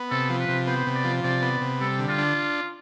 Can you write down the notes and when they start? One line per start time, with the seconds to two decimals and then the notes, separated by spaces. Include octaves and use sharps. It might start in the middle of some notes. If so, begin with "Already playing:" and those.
Already playing: B3
0.11 C3 A4
0.30 F3
0.39 B4
0.49 C3
0.67 B3 C5
0.87 C3
0.95 D5
1.04 F3
1.23 C3 D5
1.42 B3
1.61 C3
1.81 G3 A4
1.99 D3
2.09 F4
2.18 D4